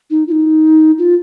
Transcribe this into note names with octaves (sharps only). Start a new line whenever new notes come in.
D#4
F4
D#4
F4